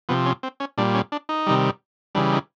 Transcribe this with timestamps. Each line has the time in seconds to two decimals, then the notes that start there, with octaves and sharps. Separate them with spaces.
0.09 C3 F3 B3
0.26 C#4
0.43 C4
0.60 C#4
0.78 A#2 G3 D4
0.95 C#4
1.12 D4
1.29 D#4
1.47 C3 D#3 G3
2.15 C#3 E3 G3 D4
2.32 D#4